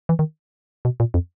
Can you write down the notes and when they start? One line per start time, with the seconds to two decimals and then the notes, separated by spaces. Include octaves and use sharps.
0.09 E3
0.19 D#3
0.85 B2
1.00 A#2
1.14 F2